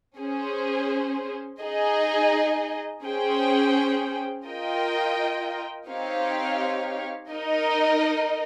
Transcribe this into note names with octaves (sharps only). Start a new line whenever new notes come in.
C#4 G#4 C5
D#4 G#4 D#5
C#4 G#4 C5 G5
F4 A#4 D#5 G5
C4 D#4 G4 C#5 F5
D#4 A#4 D#5